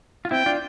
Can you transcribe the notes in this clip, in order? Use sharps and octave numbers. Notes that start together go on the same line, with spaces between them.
F4
C4 E4 G5
D4 F4